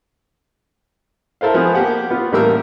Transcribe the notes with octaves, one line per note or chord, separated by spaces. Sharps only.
E4 A4 A#4 C5 F5
F3 B3 G#4
A#3 G4 F#5
B3 F4
A1 G3 A3 A#3 A#4 E6